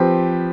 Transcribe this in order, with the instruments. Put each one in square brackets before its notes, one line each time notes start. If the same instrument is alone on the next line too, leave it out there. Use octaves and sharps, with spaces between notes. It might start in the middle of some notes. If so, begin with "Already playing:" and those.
Already playing: [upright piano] F3 C4 G4 B4